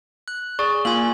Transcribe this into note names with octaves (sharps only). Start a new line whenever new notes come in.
F#6
G#4 D5 C#6
A#3 F4 G#5 F#7